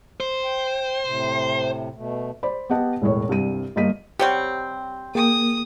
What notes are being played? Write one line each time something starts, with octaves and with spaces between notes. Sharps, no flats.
C5
G5
A2 C3
B2 A3
C5 D5 B5
B3 G4 D#5 F#5 A5
E1 A2 C#5
C2 G2 C3 D#7
G1 A#3 D#5 B6 D#7
C3 G3 C4 G4 C#5 F#5
A#3 G#4 G5 D#6